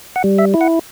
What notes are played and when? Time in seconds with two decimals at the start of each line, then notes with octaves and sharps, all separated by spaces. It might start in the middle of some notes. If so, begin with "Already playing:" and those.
0.16 F#5
0.24 G3
0.38 E5
0.54 E4
0.61 F#5